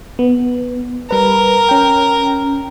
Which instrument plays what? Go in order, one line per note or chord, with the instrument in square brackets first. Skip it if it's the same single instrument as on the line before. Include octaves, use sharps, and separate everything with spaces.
[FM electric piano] B3
[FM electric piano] G3 B4 [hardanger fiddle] A#4
[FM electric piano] C#4 G5